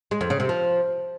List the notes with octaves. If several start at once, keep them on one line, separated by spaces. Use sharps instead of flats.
G#3
F2
C#3
C3
F3